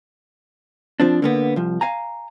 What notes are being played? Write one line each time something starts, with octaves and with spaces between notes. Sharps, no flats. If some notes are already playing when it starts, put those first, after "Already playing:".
F3 C4 D4
D3 A#3 B3
C2 F3
F5 G#5 A#5